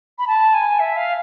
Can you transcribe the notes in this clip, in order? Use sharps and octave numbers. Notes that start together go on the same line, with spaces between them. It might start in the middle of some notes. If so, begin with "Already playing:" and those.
B5
A5
G#5
E5
F5